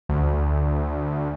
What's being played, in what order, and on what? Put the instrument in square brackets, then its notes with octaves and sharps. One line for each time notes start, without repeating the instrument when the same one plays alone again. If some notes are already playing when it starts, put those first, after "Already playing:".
[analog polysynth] D2